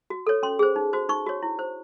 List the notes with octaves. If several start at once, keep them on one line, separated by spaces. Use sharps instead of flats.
F#4
A4 C#5
C#4 C6
G#4 C5
D#4
F#4 C5
D#4 C#6
F#4 C#5
E4
C5